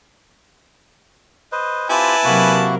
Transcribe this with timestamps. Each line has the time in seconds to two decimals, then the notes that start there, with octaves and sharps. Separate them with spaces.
1.52 B4 C5 D#5
1.90 C4 E4 F4 G4 B4 G#5 A5
2.24 C3 F#3 A#3 F#4 A#4